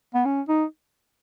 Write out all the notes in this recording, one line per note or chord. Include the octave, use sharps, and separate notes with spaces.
B3
C#4
D#4